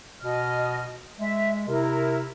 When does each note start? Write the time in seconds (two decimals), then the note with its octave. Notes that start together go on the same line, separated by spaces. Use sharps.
0.22 B2 D#5 F6
1.20 G#3 E5
1.67 C3 E4 A#4